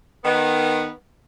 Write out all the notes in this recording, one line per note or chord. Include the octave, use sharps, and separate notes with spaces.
D#3 B3